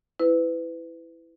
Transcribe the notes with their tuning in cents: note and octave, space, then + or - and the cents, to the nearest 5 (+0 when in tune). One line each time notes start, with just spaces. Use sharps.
E4 +0 B4 +30